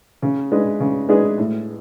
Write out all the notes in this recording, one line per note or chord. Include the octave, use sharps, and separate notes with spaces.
C#3
G#3 D4 G#4 B4
C#3
G#3 D4 G#4 B4
A2